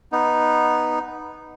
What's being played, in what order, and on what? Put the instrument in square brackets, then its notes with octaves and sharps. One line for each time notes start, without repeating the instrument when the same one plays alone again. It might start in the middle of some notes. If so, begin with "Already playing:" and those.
[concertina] B3 D#4